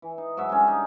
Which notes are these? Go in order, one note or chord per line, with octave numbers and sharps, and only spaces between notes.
E3
D#4
G#2 F#3 F#4 E5
D3 G3 C#4
D#4